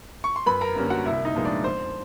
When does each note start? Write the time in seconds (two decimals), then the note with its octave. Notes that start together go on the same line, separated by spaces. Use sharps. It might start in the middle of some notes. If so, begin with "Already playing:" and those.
0.24 C#6
0.36 C6
0.46 F#2 B4 B5
0.61 A#4 A#5
0.76 D3 G3 A#3 C#4
0.90 F#4 F#5
1.06 C2 E4 E5
1.25 D#4 D#5
1.34 A#2 F3 G#3 B3
1.45 D4 D5
1.64 F2 C5